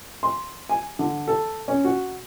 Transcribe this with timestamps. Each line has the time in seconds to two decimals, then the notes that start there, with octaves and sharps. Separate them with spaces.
0.23 C6
0.69 G#5
0.99 D3
1.28 A4
1.68 C#4
1.84 F#4